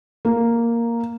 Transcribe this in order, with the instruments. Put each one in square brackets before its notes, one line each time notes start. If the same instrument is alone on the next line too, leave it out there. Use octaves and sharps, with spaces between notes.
[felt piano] A#3